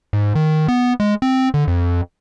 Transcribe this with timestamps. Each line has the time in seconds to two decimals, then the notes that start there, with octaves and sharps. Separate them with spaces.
0.13 G#2
0.35 D#3
0.68 B3
1.00 G#3
1.22 C4
1.54 D3
1.68 F2